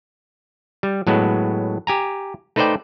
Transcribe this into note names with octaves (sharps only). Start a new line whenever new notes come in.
G3
A2 F#3 G#3 B3
G4 G#5 A#5
A3 D#4 B4 C5 D5 G5